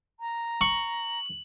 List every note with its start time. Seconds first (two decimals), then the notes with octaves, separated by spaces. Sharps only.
0.20 A#5
0.61 C#6 F#7